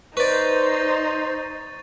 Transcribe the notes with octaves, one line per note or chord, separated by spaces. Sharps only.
D#4 B4 C5 D5 C#6 A6